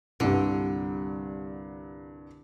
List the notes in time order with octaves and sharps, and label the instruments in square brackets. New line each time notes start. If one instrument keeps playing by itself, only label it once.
[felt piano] C2 G2 [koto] D3